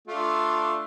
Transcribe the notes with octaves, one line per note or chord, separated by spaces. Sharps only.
A3 D4 F4